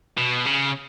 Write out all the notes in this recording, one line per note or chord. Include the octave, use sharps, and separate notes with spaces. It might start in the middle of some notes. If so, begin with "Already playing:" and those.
B2
C#3